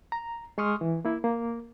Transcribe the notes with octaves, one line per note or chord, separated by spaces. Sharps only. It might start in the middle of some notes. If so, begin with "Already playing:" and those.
A#5
G#3 C6 C#6 D#6 F6
E3
A#3 E4
A#3